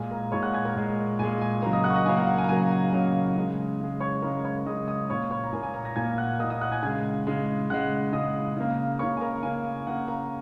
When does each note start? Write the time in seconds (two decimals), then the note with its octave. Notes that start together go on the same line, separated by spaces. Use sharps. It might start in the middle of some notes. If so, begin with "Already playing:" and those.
Already playing: A#2 G#3 G#5
0.11 A#4 A#5
0.32 A#2 G#3 C#5 C#6
0.43 F#5 F#6
0.54 G#5 G#6
0.65 A#4 A#5
0.75 A#2 G#3
1.19 A#2 G#3 G#5
1.41 G#5
1.62 C#3 F#3 A#3 A#4 A#5
1.73 D#5 D#6
1.84 F#5 F#6
1.90 C#6
1.94 D#5 D#6
2.06 C#3 F#3 A#3 G#5
2.17 F#5
2.27 F#5
2.38 G#5
2.44 A#5
2.49 C#3 F#3 A#3 G#5
2.71 F#5
2.93 C#3 F#3 A#3
3.36 C#3 G#3
3.80 C#3 G#3
4.00 C#5 C#6
4.22 C#3 G#3 A#4 A#5
4.45 C#5 C#6
4.66 C#3 G#3 D#5 D#6
4.88 D#5 D#6
5.10 A#2 A#3 C#5 C#6
5.31 C#5 C#6
5.44 A#5
5.53 A#2 A#3 G#5
5.63 G#5
5.74 A#4 A#5
5.85 A#5 A#6
5.96 A#2 A#3 G#5 G#6
6.18 F#5 F#6
6.39 A#3 D#5 D#6
6.44 A#2
6.50 D#5 D#6
6.61 F#5 F#6
6.72 G#5 G#6
6.83 C#3 G#3 G#5 G#6
7.27 C#3 G#3
7.70 C#3 G#3 F#5 F#6
8.13 C#3 G#3 D#5 D#6
8.57 C#3 A#3
8.99 C#3 A#3 C#5 C#6
9.17 G#5
9.21 A#4 A#5
9.43 C#3 A#3 G#5
9.87 C#3 A#3 F#5
10.08 A#4 A#5